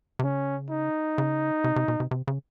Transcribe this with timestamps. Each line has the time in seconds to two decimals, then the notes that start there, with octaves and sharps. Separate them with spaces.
0.19 C3
0.23 C#3 C#4
0.71 D#4
1.18 C#3
1.64 C3
1.76 C3
1.88 B2
2.00 C3
2.11 C3
2.28 C#3